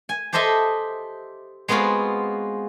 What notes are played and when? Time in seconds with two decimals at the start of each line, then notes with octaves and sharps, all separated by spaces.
0.09 G#5
0.33 G4 A4 C5 D#5 E5 A5
1.68 G#3 B3 C4 F4 F#4